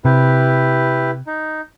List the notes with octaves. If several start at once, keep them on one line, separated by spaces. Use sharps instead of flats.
C3 E4 G4 B4
D#4